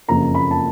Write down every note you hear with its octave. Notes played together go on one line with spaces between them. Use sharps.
F#1 F2 C#3 F3 A#3 A#5
B5
A5